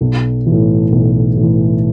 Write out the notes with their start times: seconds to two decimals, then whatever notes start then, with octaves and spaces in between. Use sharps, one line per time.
0.01 B1
0.46 E3
0.51 A2
0.92 B1
1.37 A2
1.42 E3